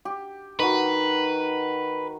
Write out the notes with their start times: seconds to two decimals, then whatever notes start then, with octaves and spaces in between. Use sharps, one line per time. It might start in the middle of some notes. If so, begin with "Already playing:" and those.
0.05 G4
0.60 D#3 F#4 B4